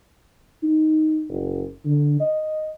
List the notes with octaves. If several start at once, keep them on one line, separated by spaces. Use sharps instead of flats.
D#4
F#1
D3
D#5